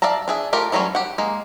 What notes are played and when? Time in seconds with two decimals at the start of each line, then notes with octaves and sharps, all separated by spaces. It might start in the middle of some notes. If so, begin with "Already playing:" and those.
0.02 D5 E5 F5 A5 A#5
0.28 D4 G#4 E5
0.53 A3 F4 G4 A#4
0.72 E3 F#3 G3 A3 C#4
0.95 G4 F#5
1.18 G#3 A#3